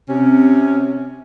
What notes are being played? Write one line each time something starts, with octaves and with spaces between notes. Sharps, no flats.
C3 C#4